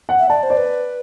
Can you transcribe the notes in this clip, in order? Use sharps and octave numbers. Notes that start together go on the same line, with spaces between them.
F#5
E5
D5 A5
C5
D5
B4